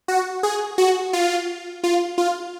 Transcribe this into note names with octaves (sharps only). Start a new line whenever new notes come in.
F#4
G#4
F#4
F4
F4
F4